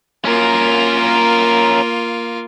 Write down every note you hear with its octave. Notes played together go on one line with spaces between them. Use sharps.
A#3 C#4 F4 A#4